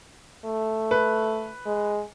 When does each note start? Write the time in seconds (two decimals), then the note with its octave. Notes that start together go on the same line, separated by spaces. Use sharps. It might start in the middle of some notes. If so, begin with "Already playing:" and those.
0.45 A3
0.91 B4
1.66 G#3